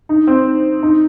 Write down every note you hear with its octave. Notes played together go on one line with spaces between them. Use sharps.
D#4
C4
D#4